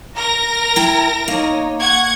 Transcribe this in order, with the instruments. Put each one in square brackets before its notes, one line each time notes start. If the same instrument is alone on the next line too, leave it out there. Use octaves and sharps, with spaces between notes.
[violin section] A#4 A#6 [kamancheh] A#5
[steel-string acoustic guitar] E4 G5
[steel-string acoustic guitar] A#3 [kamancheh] D#4 C#5
[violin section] F#5 G#6 [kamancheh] C#6